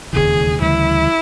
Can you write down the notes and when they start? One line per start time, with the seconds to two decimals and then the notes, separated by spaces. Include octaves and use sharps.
0.13 E1 D#2 C#3 E3 G#4
0.61 D2 C#3 E3 G3 E4